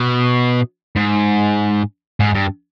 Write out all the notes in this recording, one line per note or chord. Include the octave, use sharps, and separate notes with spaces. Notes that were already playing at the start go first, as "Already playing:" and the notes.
Already playing: B2
G#2
G#2
G2